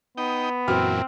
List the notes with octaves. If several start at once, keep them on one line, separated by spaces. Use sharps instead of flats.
B3 D#4 G5
F#2 A#2 E3 C4 F#4 F6